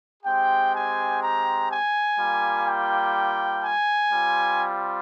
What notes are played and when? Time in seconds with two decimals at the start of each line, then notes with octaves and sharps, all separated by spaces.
0.23 G#3 C4 G4 G5
0.72 G#5
1.21 A#5
1.70 G#5
2.18 G3 A#3 F4
2.66 G5
3.64 G#5
4.12 G3 C4 F4